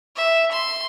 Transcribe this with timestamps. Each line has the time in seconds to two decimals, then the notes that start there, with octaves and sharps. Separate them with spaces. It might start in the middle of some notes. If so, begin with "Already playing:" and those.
0.16 E5
0.51 C6